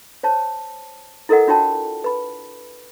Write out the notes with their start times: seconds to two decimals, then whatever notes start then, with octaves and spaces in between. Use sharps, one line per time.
0.23 C5 C#5 A5
1.29 E4 A4 A#4 D#5 F#5
1.48 D4 F4 F#4 C#5 G5 A5
2.04 B4 B5